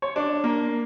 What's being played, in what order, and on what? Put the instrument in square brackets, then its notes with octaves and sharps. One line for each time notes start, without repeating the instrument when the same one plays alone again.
[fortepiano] C#5
D4
A#3